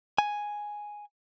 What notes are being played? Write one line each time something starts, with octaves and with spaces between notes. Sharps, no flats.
G#5